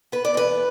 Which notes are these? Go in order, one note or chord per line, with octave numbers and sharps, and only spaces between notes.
B3 B4
D5
E2 B4